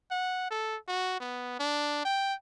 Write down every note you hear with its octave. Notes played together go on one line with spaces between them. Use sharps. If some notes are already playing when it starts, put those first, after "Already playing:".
F#5
A4
F#4
B3
D4
G5